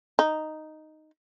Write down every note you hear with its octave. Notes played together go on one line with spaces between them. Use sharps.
D#4